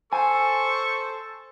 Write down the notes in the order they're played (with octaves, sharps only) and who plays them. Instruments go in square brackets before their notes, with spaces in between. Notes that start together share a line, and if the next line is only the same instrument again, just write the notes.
[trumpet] A4 [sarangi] C5 [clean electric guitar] G#5 [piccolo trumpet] C#6